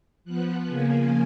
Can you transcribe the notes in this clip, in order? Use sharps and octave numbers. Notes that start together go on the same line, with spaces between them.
F3 B3 F#6
C#3 F3 A#3 G#5